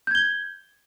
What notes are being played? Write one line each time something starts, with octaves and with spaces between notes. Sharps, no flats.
G6 G#6 G7